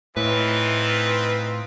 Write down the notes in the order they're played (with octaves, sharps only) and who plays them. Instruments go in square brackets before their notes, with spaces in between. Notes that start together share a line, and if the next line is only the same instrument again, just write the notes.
[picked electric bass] A2 [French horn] E3 [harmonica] C4 D#4 F4 [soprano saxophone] B4